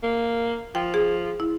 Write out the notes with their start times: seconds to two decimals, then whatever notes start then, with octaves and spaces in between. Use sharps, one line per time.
0.03 A#3
0.75 F3 G5
0.94 G#4
1.40 E4